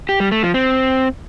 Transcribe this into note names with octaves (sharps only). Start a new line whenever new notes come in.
G4
G3
A3
F3
C4